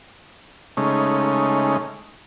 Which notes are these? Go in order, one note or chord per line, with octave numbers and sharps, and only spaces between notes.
C#3 G#3 A3 C#4 D#4